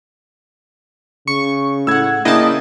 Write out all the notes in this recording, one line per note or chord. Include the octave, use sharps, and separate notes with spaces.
C#3 C#6
A2 F#5 E6 G#6
C#3 A#3 D4 E4 D#5 G5 A5